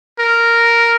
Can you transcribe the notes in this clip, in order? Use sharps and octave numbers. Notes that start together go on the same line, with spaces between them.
A#4